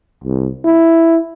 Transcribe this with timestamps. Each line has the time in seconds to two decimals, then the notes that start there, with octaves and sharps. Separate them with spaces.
0.24 C2
0.65 E4